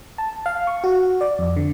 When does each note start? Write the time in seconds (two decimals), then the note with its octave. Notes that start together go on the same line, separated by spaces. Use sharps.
0.18 A5
0.46 F5
0.67 C#6
0.84 F#4
1.21 D5
1.39 F2
1.56 D3